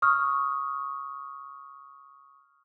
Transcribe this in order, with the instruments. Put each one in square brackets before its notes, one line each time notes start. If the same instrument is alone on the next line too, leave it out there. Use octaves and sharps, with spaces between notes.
[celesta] C#6 D#6 F6